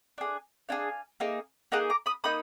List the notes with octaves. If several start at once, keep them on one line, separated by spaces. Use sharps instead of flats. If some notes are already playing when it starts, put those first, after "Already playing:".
D4 G#4
D4 G#4 F5 G#5
A#3 D#4 G#4
A#3 D#4 G#4 F#5 A#5
A#5 D6
B5 D#6
A#3 D#4 B5 D#6